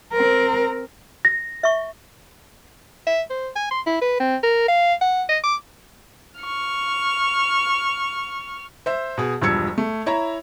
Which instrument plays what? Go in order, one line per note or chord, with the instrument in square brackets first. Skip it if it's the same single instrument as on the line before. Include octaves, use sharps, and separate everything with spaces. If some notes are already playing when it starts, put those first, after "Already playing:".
[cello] C4 A#4
[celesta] A#6
[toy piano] E5 C#6
[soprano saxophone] E5
C5
G#5
C6
E4
B4
C4
A#4
F5
F#5
D#5
D6
[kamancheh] C#6 F6
[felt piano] C5 E5
B2 G#4
E1 G2 F3 E6 G#6 C#7
A3
E4 C#5 E5 A#5